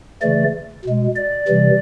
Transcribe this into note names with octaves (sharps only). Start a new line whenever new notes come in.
C#3 E3 A3 D5
B2 G#3
D5
C3 E3 G3